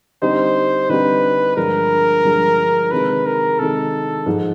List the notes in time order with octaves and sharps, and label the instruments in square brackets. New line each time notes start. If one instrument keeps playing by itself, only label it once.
[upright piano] D3 G3 C4 D#4 G4 [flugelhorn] C5
[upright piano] D3 G3 C4 D#4 G4 [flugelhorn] B4
[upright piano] G2 D3 F3 G#3 [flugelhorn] A#4
[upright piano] G2 D3 F3 G#3
[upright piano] C3 D#3 G#3 [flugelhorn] B4
[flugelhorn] A#4
[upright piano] C3 D#3 G#3 [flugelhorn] A4
[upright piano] G#2 F3 G#3